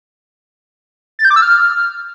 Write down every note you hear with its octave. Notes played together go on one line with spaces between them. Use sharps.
A6
G6
D6
E6
F6